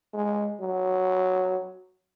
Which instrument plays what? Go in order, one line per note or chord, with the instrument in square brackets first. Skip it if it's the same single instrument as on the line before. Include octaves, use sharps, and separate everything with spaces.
[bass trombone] G#3
F#3